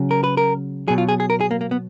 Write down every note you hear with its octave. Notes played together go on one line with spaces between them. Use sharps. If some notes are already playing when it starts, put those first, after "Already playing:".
Already playing: C#3 F#3
A#4
B4
A#4
B2 F#3 G#4
F4
G#4
G#4
A#4
G#4
A#3
A#3
B3